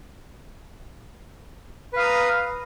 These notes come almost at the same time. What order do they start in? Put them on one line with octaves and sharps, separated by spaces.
B4 F5 D#6 A#5